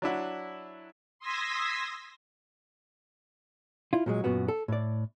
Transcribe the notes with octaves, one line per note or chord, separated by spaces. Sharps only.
F#3 D4 E4 F#4
C6 D#6 E6 G#6 A#6 B6
E4 F4
A#2 F#3 G#3
F#2 A#2 B3 F#4
A4
A2 D5